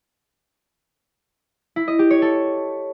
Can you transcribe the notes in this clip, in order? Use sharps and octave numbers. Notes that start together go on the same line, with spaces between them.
E4
D#5
G4
C#5
A4